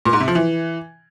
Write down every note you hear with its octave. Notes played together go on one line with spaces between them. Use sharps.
A#2
G#2
C3
F3
E3